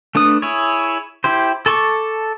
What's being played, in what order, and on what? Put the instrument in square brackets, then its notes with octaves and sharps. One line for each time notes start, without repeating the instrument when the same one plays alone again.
[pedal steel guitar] A3 D4 B4 D#6
E4 G#4 C#5
E4 G4 C5
A4 A5 C#6 D6